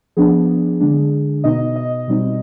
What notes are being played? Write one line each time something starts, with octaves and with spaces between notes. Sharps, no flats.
F3 B3 D4 G#4
D3 G#3 D4
B2 B3 D#4 D#5
D#5
B2 G3 C4 D#4